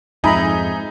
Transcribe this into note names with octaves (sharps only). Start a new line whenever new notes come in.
F2 G#2 D#4 E5 G#5 A#5 B5 D#6